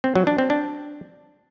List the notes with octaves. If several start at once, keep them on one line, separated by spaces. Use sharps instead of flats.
C4
F#3
D4
C4
D4